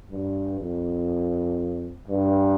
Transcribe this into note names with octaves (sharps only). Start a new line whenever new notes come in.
G2
F2
G2